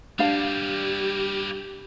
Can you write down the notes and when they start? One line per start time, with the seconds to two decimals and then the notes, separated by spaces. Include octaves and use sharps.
0.19 G3 A#3 D4 G4 F5